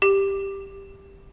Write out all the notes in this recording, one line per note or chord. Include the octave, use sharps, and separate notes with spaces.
G4